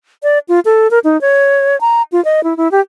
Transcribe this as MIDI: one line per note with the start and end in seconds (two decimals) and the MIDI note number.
0.23 0.39 74
0.49 0.60 65
0.65 0.90 69
0.91 0.99 70
1.04 1.20 63
1.21 1.79 73
1.81 2.02 82
2.12 2.23 65
2.25 2.43 75
2.44 2.56 64
2.57 2.71 64
2.71 2.81 67